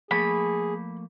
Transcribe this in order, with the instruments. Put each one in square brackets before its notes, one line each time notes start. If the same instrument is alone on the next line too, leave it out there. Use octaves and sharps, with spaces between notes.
[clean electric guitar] F3 A3 A#3 [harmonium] G#4 [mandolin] B5